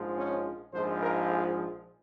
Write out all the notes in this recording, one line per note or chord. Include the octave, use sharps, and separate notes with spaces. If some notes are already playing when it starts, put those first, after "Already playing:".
Already playing: A#1 G#2 F3 G#3
C#4
A#1 G#2 F3 G#3 C5
A#4
G#4